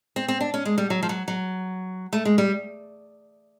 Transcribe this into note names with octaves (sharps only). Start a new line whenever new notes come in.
C4
C4
D4
C#4
G#3
G3
F#3
F3
F#3
F#3
A3
G#3
G3